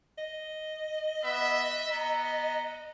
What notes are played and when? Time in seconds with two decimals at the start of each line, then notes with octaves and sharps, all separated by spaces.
0.18 D#5
1.24 B3 E5
1.93 B3 A#5